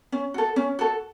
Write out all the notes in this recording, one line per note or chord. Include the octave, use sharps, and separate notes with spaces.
C#4
F#4 A4
C#4
F#4 A4